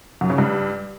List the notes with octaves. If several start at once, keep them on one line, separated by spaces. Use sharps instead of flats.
F#2
C#3
G2